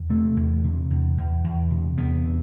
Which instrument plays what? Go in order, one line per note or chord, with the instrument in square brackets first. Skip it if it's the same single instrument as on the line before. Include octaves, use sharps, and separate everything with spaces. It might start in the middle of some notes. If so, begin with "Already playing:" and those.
Already playing: [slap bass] E2
C3 A3
E2
C3
E2
E2
E2
C3
E2 B3
C3